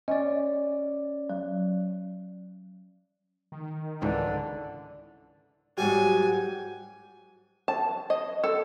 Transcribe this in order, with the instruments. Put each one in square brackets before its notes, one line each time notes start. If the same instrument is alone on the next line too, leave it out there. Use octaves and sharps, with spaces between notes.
[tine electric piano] C#4 D5 [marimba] D#5
[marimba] F#3
[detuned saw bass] D#3
[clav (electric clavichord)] C#2 G#2 E3 [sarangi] D3
[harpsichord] G#2 F#3 G3 [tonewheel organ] F#4 G4 [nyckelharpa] G#5
[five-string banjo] A5
D#5
A4